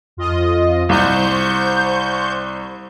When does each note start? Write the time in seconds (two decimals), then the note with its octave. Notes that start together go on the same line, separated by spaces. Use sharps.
0.17 F2 F4 D#5
0.89 C2 C5 C#6 G6